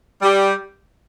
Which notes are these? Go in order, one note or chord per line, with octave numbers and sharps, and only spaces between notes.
G3 G4